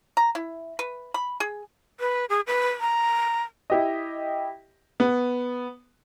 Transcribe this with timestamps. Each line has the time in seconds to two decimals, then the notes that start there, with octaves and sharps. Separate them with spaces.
0.17 A#5
0.35 E4
0.79 B4
1.14 B5
1.40 G#4
2.00 B4
2.30 G#4
2.47 B4
2.81 A#5
3.70 E4 G4 D#5
5.00 B3